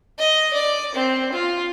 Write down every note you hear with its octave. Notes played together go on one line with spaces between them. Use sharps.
D#5
D5
C4
F4